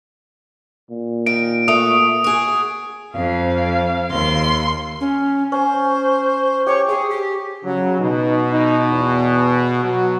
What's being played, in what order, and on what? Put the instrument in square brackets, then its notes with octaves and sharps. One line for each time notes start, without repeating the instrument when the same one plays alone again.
[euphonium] A#2
[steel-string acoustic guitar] D#3 [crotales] D7
[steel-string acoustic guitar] A3 F#4 [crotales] D#6
[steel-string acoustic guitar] F#4 G#4
[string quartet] F2 [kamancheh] F5
[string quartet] D#2 C6
[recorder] C#4
[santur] C#4 [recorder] C5
[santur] G4 C#6 D6 [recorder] C#5
[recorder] G#4 [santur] D6 D#6
[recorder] G4
[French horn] C#3 [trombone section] F#3
[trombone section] B2 [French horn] D#4
[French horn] D#4
E2
[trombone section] B2 F#3 [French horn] F#4